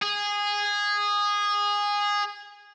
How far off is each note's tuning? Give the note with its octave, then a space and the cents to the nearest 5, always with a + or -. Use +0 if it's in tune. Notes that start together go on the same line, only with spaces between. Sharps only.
G#4 -15